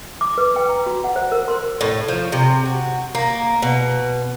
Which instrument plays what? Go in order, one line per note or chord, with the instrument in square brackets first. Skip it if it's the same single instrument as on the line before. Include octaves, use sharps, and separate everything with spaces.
[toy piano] D6
B4
G5
A#5
F#4
F#5
C5
A#4
C6
[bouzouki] A2
F3
C3
F#4
A#3
B2